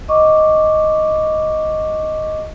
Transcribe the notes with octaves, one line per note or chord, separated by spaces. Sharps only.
D#5 C#6 D6